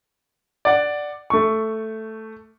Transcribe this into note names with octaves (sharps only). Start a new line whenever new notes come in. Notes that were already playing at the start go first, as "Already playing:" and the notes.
D5 F#5
A3 C#6